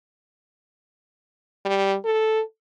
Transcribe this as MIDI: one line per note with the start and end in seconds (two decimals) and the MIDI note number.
1.65 1.96 55
2.04 2.41 69